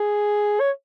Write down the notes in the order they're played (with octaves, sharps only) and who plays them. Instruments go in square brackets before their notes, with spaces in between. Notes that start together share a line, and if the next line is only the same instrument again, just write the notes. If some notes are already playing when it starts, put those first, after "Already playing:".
Already playing: [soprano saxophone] G#4
C#5